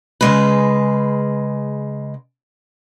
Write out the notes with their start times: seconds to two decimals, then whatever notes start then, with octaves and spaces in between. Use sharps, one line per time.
0.21 C#3 G#3 B4